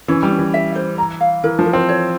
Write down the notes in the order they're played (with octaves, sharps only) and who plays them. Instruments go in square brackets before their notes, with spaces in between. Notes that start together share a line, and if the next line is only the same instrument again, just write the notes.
[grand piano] E3 [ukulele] C#4
[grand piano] G3
[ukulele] C#4
[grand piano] E3
[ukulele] E5
C5
A#5
F5
[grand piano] E3 [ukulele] A#4
[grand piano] F3
[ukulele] A#4
[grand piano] C4
[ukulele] C#5